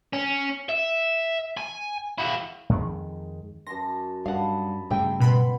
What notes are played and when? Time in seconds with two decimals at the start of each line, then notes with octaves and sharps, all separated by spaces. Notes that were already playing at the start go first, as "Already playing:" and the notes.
0.13 C#4
0.69 E5
1.57 G#5
2.18 E4 F#4
2.69 F2 D#3 G#3
3.67 F#2 A5 C6 A#6
4.26 G2 D#5 F5 F#5 A5 B5
4.90 G2 C#3 G#3 A3 G5
5.20 B2 B3 B5 C6